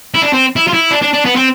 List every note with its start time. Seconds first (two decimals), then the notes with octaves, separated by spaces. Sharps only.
0.14 E4
0.22 D4
0.33 C4
0.56 E4
0.68 F4
0.73 E4
0.91 D4
1.02 D4
1.13 D4
1.25 B3
1.36 C4